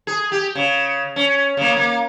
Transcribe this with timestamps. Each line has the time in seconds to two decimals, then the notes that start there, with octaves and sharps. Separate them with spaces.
0.07 G#4
0.32 G4
0.55 C#3
1.16 C#4
1.57 C#3 A#3
1.77 A#3